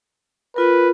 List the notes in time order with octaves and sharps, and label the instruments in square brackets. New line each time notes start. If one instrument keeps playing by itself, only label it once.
[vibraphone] F4 A#4 [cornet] B4